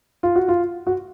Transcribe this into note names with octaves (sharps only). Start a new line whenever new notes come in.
F4
F#4
F4
F#4